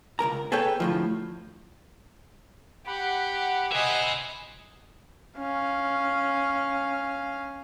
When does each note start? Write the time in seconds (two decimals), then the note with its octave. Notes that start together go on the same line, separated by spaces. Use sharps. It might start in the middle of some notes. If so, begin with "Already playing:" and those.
0.19 C#2 G2 A#4 A#5
0.52 G#4 A4 B4 C#5 G5
0.80 D2 A2 F3
2.87 G4 F#5 B5
3.72 C5 D#5 E5 G#5
5.38 C#4 F5